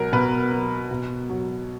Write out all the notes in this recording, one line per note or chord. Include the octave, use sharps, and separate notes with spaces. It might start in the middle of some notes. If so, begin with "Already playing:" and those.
Already playing: B2 F#3 A#4
B2 B4
F#3
B2
F#3